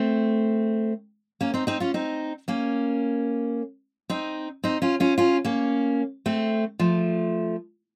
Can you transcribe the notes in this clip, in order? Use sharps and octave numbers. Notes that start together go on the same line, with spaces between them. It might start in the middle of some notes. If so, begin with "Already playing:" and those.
Already playing: A3 C4
A#3 C#4
C4 D#4
C4 D#4
C#4 F4
C4 D#4
A#3 C#4
C4 D#4
C4 D#4
C#4 F4
C#4 F4
C#4 F4
A#3 C#4
A3 C4
F3 A3